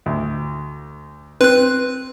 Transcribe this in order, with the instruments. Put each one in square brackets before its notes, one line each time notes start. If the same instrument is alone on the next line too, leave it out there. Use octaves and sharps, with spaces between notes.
[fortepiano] D2
[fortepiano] C4 [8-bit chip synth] B4 F#6